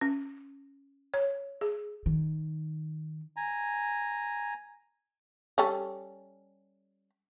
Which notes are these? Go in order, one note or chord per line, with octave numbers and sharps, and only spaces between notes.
C#4
C#5
G#4
D#3
G#5 A#5
G3 C#4 A4